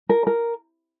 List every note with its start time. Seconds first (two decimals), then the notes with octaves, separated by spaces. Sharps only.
0.09 A#4
0.27 A#4